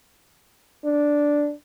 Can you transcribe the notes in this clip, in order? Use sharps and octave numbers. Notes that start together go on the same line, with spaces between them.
D4